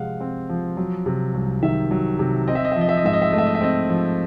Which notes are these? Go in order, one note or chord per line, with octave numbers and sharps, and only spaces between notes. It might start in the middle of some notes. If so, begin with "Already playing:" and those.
Already playing: C3 F3 G#3 C4 F5 F#5
C4
F3
F#3
C3
C2
D#3 E5
F#3
C3
C4 D#5
E5
D#5
E5
F3
D#5
E5
D#5
G#2 E5
D#5
E5
A3 D#5
E5
D#5
E5
C4 D#5
F3